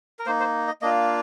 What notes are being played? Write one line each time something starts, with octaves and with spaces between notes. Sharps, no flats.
A#4
A#3 D#4 C5
C5
D#5
A#3 D4 F4 D#5